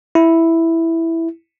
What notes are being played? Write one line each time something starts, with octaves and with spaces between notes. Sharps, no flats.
E4